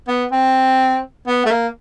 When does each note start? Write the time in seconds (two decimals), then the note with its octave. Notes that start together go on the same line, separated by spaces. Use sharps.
0.08 B3
0.32 C4
1.27 B3
1.46 A3
1.51 A#3